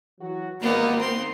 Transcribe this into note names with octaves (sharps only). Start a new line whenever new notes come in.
E3 F#3 F#4
G#1 G2 D#3 A#3 B3 D#4
C4 C6